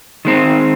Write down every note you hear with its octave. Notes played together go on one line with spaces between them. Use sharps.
D#3 G#3 C4